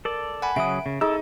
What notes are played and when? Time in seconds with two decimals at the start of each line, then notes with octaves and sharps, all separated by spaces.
0.05 A4 A#4 D5
0.42 F#5 G#5 B5
0.56 C#3 F#3 E5 D#6 D7
0.86 C#3
1.01 D#4 E4 G#4 A4 E6